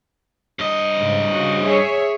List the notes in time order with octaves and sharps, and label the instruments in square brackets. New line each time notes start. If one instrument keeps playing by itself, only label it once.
[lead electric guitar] G2 D#5
[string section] G#2 C#3
C#3 F#4
G#4 C#5 E5